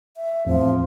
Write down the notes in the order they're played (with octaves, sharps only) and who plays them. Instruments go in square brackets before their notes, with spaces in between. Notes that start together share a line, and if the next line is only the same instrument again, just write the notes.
[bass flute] E5
[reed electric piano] E2 A2 C4 [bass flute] F3